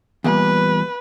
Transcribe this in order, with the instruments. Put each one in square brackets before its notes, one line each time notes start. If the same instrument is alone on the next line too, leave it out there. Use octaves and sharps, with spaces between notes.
[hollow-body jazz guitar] E2 A#2 G3 [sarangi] B4